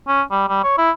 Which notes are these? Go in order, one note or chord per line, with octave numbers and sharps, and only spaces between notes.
C#4
G3
G3
C#5
E4